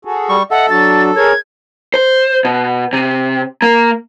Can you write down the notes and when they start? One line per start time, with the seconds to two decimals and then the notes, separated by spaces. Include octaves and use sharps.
0.05 F#4 G#4 A4
0.29 G3 C#6
0.51 A4 D#5 E5 F#5
0.70 F#3 D4 F#4 A6
1.16 G#4 A#4 C#5 G#6
1.94 C5
2.45 B2
2.93 C3
3.62 A#3